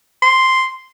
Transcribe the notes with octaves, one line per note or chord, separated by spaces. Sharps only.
C6